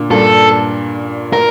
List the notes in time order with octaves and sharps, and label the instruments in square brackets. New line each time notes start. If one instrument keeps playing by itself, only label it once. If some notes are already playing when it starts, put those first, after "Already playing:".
Already playing: [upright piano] A#2 D3
[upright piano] G2 A#2 [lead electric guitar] A4
[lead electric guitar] A#4